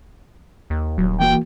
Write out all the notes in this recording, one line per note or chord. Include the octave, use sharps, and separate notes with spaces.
D#2
D#1 F#3
E3 A#3 F#4 G5